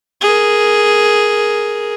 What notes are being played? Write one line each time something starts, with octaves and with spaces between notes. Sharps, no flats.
G#4 A#4